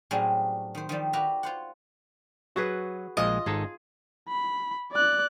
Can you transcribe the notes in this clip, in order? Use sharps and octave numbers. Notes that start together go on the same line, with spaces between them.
A2 F#3 G3 C4 C#4 G#4
D#3 C5
D#3 F3 G3
F#4 G4 A#4 B4 E5 A#5
F4 C5 F#5
F#3 F#4 G#4 B4
A#1 F3 G#3 F4 D#5
G#1 D#4 G#4 A4
B5
D5 F#6